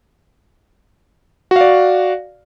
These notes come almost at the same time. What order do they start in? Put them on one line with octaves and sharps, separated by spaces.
F#4 F5 D5